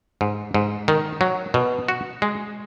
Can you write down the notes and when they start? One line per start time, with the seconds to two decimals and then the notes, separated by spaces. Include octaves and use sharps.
0.21 G#2
0.54 G#2
0.88 D#3
1.21 F#3
1.54 B2
1.88 F#4
2.22 G#3